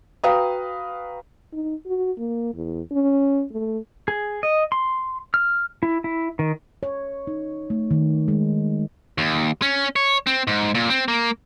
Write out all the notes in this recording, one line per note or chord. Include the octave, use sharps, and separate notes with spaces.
F#4 B4 F5 G5 A#5 D#6
D#4
F#4
A#3
E2
C#4
A3
G#4
D#5
C6
F6
E4
E4
D#3
C#5
D#4
A3
D#3
G#3
D#2
C#4
C#5
C4
G#2
A#2
C4
A#3